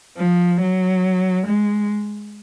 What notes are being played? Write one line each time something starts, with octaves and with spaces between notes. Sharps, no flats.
F3
F#3
G#3